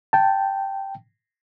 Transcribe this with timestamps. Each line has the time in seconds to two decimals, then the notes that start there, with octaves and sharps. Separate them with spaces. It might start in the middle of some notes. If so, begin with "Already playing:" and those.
0.13 G5 A5